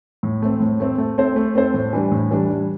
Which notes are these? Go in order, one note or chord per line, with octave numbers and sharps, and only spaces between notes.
A2
A3 C4
A2
A3 C4
A3
C4 A4 C5
A3
C4 A4 C5
A2
E3 G3 D4
A2
E3 G3 D4
G3